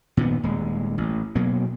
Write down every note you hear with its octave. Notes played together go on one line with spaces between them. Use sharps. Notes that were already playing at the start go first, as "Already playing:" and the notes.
A#2 D#3 B3
D#1 G#3
A1
B2 F#3 A#3